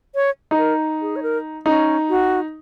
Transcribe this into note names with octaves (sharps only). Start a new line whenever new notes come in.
C#5
D#4
A#4
G#4
C#5
A#4
C#4 D#4
F#4